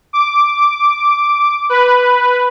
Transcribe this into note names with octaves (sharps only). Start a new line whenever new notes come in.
D6
B4